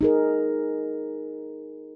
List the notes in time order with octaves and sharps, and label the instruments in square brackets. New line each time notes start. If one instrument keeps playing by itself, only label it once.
[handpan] D#4 G#4 A#4